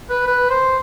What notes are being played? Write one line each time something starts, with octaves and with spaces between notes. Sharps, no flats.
B4
B4
C5